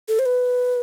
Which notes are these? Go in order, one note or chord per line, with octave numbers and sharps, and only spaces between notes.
A4
C5
B4